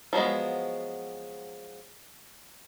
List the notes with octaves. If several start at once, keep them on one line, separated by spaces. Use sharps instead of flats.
F3 F#3 G#3 B3